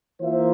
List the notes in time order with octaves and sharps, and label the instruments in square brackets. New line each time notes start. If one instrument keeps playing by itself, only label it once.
[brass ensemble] E3 A#3 F4 C5 E5